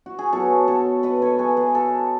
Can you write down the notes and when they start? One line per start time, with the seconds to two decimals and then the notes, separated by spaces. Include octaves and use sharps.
0.06 F#4
0.19 G#4
0.32 B2 F#3 F#4 A4
0.68 A4 C#5
1.03 B4 D#5
1.22 A4 C#5
1.39 G#4 B4
1.57 G#4 B4
1.75 F#4 A4